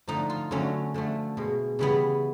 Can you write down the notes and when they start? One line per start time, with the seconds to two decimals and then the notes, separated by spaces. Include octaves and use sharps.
0.07 D3 F3 A3 D#4
0.30 F4
0.51 D3 F#3 A3 C#4
0.94 D3 F3 A3
1.37 B2 G#3
1.79 C#3 E3 G3 B3